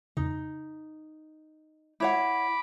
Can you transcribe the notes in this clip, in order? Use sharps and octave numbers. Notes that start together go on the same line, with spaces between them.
F2 C#3 D#4
E4 C#5 F#5 B5 D6